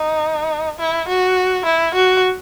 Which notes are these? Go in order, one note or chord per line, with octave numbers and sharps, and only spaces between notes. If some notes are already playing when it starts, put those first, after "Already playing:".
Already playing: D#4
E4
F#4
E4
F#4